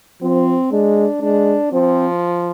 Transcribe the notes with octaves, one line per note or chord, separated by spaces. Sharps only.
F3 C4
G#3 D4
G#3 D4
F3 C4